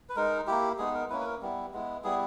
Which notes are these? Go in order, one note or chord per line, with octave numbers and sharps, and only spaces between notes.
B4
G#3 D#4 A#4
A#3 E4 G4
G#3 B3 D#4 G#4
A#4
A#3 C#4 E4 B4
B4
A#4
G3 B3 E4
G#3 B3 E4
G3 B3 E4 G#4